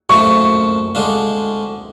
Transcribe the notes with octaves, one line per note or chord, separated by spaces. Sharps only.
F#2 F3 A3 F4 C#6
D3 G#3 D4 F4